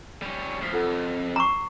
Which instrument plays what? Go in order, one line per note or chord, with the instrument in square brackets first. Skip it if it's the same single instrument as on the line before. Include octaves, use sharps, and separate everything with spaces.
[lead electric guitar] G3 C#4
[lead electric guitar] D2 F3 [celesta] B6 C7
[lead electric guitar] F2 [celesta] F4 A4 F#5
[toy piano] A#5 C#6 [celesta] D6 E6 C7